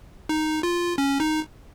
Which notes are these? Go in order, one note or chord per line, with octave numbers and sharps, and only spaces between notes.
D#4
F4
C#4
D#4